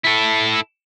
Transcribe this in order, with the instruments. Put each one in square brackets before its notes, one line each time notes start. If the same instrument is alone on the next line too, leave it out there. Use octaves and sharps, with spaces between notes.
[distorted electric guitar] E4 A4